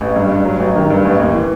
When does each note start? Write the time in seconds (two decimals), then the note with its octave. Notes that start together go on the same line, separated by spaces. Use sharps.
0.01 A1
0.16 G2
0.32 G2
0.45 F#3
0.60 A1
0.76 D#3
0.90 G2
1.05 A1
1.20 D#2
1.34 E3